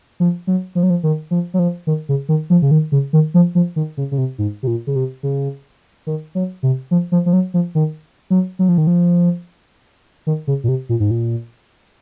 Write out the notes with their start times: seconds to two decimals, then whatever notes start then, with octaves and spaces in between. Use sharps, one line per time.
0.20 F3
0.47 F#3
0.75 F3
0.83 F#3
0.90 F3
1.03 D#3
1.31 F3
1.54 F#3
1.59 F3
1.87 D#3
2.09 C#3
2.29 D#3
2.50 F3
2.62 C#3
2.71 D#3
2.92 C#3
3.13 D#3
3.34 F3
3.55 F3
3.76 D#3
3.97 C#3
4.11 C#3
4.18 C3
4.38 G#2
4.63 C3
4.67 A#2
4.87 C#3
4.96 C3
5.23 C#3
6.07 D#3
6.35 F#3
6.63 C3
6.91 F3
7.12 F3
7.26 F3
7.33 F#3
7.54 F3
7.75 D#3
8.30 F#3
8.59 F#3
8.69 F3
8.78 D#3
8.87 F3
10.27 D#3
10.47 C#3
10.64 A#2
10.68 C3
10.89 A#2
11.00 G#2
11.11 A#2